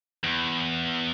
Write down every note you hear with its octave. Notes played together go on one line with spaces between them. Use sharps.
E2